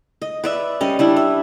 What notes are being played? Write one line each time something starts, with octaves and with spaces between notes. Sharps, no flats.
D#5
B4 D5 E5
G3 C#4 D#5
G3 D4 E4
E5